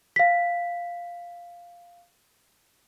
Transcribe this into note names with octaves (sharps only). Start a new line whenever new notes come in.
F5 B6